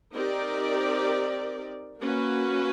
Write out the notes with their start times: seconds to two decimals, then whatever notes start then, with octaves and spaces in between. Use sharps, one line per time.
0.13 C4 D#4 G4 A#4 D5
1.99 A#3 C#4 F#4 B4